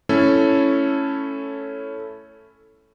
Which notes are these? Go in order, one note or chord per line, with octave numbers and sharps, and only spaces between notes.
A3 C#4 E4 A4